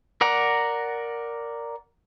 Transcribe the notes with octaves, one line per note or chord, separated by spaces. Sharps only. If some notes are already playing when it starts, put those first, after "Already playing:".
A#4 D5 F#5 A#5